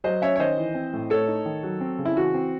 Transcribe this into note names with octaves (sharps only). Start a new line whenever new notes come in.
F#3 C5 D#5
C#4 C#5 E5
C#5
D#3 C5 D#5
E3
C4
A2
A3 A4 C#5
D#4
D#3
F#3
C4
C#3
E4
E3 F#4
C4